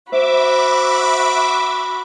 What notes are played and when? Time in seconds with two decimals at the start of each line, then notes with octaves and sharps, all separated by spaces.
0.12 F#4 C5 E5 B5 D6